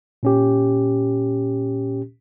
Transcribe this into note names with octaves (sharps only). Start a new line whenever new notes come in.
A#2 C#4 G4